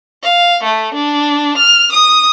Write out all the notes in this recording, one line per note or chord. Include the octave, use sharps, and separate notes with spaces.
F5
A3
D4
F6
D#6